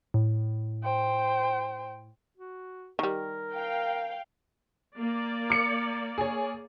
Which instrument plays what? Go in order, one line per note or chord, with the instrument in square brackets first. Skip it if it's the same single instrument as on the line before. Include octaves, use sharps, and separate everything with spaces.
[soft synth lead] A2
[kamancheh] C5 G5
[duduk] F#4
[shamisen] D#3 G3 [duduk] A#4
[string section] F5 G5
[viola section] A#3 D5
[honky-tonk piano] D6 C#7
G#4 C#5